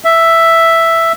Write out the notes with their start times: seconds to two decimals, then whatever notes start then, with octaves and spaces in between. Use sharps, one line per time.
0.05 E5